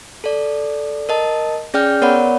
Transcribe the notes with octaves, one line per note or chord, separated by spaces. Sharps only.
A4 D5
A#4 D#5 A5
C#4 G#4 D5 G5 F6 G6
B3 A#4 C#5 D5 F#5 B5